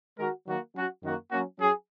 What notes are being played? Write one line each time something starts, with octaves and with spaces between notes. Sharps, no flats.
D#3 G#3 F#4 A#4
D#3 F#3 A#3 F#4
F#3 C#4 F#4
F#2 D#3 A#3 F#4
F#3 A#3 C#4 F#4
F#3 C#4 G#4